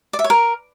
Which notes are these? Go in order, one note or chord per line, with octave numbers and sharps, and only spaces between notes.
D5
E5
C#5
A#4